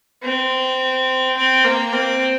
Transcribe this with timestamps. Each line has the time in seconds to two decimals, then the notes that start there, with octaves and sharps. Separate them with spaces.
0.23 C4
1.37 C4
1.64 A#3
1.93 C4